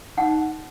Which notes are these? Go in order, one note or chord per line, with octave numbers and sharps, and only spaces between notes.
D#4 F#5